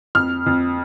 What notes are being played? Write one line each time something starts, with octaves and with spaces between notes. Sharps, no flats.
F2 F6
F2